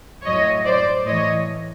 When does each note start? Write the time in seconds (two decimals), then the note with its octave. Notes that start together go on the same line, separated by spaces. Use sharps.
0.25 A2 F#3 C#5 D#5
0.66 C5 D5
1.07 A2 E3 C#5 D#5